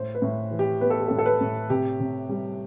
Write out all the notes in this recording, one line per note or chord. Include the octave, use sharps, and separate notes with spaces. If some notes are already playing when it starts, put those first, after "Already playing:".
Already playing: A2 C5
B4
A2
E3
G4
B3 B4
A4
G4
A2 A4
A4
B4
A2
C3 G4
C3
G3